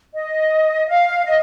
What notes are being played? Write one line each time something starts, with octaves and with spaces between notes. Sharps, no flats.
D#5
F5
D#5